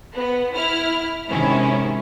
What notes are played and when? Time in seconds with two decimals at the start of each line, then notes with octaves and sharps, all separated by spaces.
0.15 B3
0.54 E4 F6
1.28 G#2 C3 D#3 C#4 E4